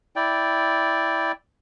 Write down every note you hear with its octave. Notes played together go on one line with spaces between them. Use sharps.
E4 D5 G5